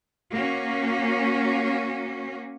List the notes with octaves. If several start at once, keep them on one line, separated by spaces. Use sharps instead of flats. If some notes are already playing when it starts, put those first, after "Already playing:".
A#3 C#4 F#4